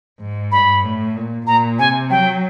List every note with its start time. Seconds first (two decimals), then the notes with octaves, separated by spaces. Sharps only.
0.20 G#2
0.52 G2 B5
0.84 A2
1.16 A#2
1.46 A#2 A#5
1.79 C3 G#5
2.10 F#3 G5